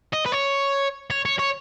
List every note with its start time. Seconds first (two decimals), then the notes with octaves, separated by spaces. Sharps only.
0.13 D#5
0.26 B4
0.32 C#5
1.11 C#5
1.25 C#5
1.39 C#5